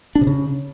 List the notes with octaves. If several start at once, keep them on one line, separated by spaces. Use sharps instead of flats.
D4
C3
C#3